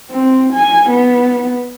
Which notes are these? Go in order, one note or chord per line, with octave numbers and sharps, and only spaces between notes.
C4
G#5
B3